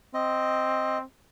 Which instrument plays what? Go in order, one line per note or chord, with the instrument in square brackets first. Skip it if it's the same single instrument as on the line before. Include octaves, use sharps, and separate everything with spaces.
[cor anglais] C4 [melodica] D#5